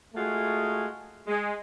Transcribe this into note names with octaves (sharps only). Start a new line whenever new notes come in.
G#3 A3 F4 F#4 G#4
G#3